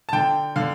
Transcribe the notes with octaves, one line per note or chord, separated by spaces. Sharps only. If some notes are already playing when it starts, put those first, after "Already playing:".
A5
D3 G5
D3 F5